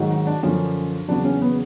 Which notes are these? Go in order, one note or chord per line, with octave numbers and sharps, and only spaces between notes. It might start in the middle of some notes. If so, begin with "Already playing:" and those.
Already playing: G#2 D#3 F#3
D#4
D4
F#2 D3 F3 C#4
E2 C#3 F#3 D4
C#4
B3